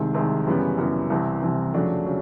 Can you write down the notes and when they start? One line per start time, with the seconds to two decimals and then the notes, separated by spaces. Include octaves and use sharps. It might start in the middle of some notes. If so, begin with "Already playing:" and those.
Already playing: C2 C3 D#3 G#3
0.14 C2 C3 D#3 G#3
0.47 F#2 C#3 E3 G3 B3
0.78 F#2 C#3 E3 G3 B3
1.10 C2 C3 E3
1.42 C2 C3 E3
1.74 F2 C#3 F#3 A3 D4
2.06 C#3 F#3